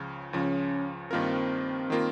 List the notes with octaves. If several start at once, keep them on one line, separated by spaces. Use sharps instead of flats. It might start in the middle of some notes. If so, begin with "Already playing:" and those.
Already playing: C#2 C#3 F3
C#2 C#3 F3 C#4
G2 D#3 A#3 C4 F4 A#4
D#3 A#3 F4 A#4